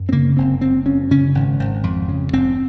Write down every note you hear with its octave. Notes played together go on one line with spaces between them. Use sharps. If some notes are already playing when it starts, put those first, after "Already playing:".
Already playing: F#2
C4
C#3 A#3
F#1 C4
F#1 C4
F#2 C#4
C#3 C#4
G#1
G#1
F2
C#3
F1 C4